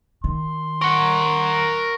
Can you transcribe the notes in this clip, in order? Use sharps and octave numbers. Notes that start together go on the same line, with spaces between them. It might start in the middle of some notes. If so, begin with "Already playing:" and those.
D#3 C6
A#4 F#5 C#6